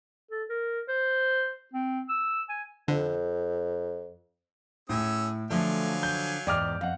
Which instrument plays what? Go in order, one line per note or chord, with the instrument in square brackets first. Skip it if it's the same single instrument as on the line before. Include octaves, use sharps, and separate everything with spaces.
[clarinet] A4
A#4
C5
C4
E6
G#5
[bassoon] F2 [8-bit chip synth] D3
[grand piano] A2 [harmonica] C#4 G#4 E6
[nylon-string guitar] D3 F3 C5 [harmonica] F#3 F5 G#5 [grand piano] A3
[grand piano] G6
[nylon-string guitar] E2 G#2 G5 [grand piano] D5 D6 F6
[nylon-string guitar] F2 [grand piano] F5 F#5